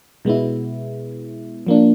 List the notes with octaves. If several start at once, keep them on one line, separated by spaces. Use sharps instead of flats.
B2 G#3 B3 E4
F3 A#3 D4